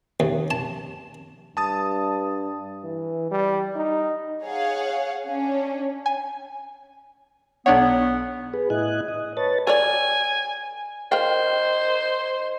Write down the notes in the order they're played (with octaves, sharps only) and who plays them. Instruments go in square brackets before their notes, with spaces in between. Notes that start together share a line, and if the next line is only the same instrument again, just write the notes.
[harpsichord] D#2
A5
[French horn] G2 [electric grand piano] A5 D#6 A6
[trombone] E3
G3
D#4
[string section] G#4 C#5 F5 F#5
C#4 D4
[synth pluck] G#5
[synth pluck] B1 D4 C#5 [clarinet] B3 [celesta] F#5
[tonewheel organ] G#4 B4
A2 E4 D#5 G#5 F#6
D#5
B4 C#5 A5 A6
[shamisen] A4 C#5 D5 [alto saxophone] G#5
[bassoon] D#4 [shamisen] A#4 F5 G5 [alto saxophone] C5